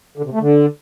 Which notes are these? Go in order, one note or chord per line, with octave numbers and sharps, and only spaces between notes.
D3
C3
A3
D3